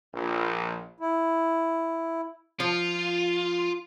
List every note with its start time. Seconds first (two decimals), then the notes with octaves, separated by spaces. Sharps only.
0.13 A#1
1.00 E4
2.60 F3 F4